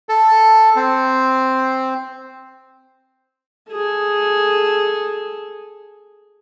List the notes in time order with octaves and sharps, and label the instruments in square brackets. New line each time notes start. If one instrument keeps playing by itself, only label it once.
[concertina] A4
C4
[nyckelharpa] G#4 A4